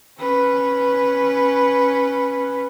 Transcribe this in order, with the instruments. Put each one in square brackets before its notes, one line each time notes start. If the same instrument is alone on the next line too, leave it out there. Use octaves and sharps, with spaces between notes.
[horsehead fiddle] C#4 B4